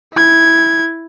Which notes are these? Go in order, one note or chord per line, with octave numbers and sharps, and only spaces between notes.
E4 G#6